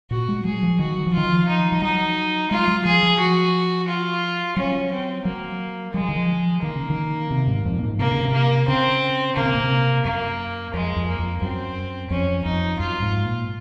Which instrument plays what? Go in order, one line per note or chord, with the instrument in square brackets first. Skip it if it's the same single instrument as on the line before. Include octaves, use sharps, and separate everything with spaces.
[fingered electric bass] A#2 [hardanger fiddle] F#4
[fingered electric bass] G#3
[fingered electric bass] F#3 [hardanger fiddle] G#4
[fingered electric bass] F3
[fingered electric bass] D#3 [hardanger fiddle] F#4
[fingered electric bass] F#3
F3
[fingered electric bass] D#3 [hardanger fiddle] F4
[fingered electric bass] F3
[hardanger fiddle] D#4
[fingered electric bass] F3
[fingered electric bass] F#3 [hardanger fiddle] D#4
[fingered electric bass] G#3 [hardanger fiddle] F4
[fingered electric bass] F#3
[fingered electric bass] F3 [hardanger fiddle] G#4
[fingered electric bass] F3
[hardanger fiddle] F#4
F4
[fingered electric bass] F#3 [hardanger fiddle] C#4
[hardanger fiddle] C4
[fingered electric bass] F#3 [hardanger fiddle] A#3
[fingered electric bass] F#3 [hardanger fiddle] G#3
[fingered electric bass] F3
D#3
F3
[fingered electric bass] D#3 [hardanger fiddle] A#3
[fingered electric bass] C#3
D#3
C3
G#2
F2
A#2
G#2
[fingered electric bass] C3 [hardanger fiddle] A#3
[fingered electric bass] C#3
C3
[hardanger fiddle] A#3
[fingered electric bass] C#3 [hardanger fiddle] C4
[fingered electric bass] C#3 [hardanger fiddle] A#3
[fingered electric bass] C3
A#2
C3
[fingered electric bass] F#2 [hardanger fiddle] A#3
[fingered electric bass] F2 [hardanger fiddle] G#3
[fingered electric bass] F2
[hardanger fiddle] A#3
[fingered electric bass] F2
[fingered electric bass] F#2 [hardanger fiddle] C4
[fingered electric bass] F2 [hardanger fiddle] C#4
[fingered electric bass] F2 [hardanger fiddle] D#4
[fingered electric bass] F#2 [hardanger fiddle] F4
[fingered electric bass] G#2
A#2